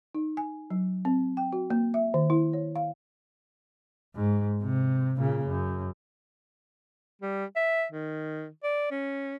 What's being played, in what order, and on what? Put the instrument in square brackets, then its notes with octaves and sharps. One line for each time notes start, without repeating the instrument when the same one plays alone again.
[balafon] D#4
G#5
F#3
C4
G5
F#4
A#3
E5
D#3
E4
C#5
F5
[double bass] G#2
C3
A#2 C#3
F#2
[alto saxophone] G3
E5
D#3
D5
C#4